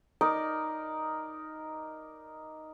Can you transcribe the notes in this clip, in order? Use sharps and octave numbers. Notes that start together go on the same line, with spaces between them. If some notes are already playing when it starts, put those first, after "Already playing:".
D#4 A#4 D5